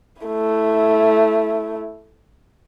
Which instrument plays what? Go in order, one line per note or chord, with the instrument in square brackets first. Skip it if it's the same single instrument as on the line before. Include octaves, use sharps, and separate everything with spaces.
[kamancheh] A3 E4